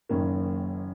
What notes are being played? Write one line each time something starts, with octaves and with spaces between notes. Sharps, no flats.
F#1 F#2 D#3 A#3 C#4